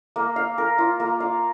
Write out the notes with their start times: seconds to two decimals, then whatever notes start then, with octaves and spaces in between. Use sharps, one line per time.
0.16 A#3
0.36 F5
0.58 A#4
0.78 F4
1.00 A#3
1.20 F5